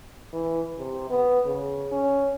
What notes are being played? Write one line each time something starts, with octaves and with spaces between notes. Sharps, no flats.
E3
C3
B3
C#3
C#4